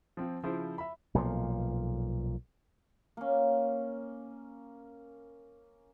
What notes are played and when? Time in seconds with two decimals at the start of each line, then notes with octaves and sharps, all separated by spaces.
0.17 F3 C4 F4
0.43 C#3 F3 E4 C5
0.78 E5 B5
1.14 B1 A#2 C#3 F3
3.17 A#3 C#4